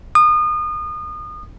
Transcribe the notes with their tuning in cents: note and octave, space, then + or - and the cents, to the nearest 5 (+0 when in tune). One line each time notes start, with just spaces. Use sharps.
D#6 -30